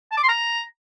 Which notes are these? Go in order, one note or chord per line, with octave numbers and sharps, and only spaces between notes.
A5
D6
C6
A#5